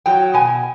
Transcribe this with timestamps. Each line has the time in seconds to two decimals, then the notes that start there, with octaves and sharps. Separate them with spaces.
0.06 F#3 G5
0.34 B2 G#5